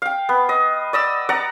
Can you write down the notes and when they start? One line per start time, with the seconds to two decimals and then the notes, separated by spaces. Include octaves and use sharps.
0.02 F5 G5
0.29 B3
0.49 D#5
0.93 D5 D#5 E6
1.29 D5 F#5 A#5